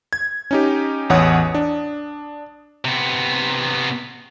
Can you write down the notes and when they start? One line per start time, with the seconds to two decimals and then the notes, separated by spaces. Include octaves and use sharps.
0.13 G#6
0.51 C#4 D#4 G4
1.10 A1 E2 C#5 F#5 D#6
1.55 D4
2.85 C3 B3